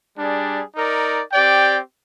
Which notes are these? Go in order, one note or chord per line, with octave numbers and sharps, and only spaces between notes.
G3 D4 G#4
D#4 A#4 D5
C4 G4 D5 G5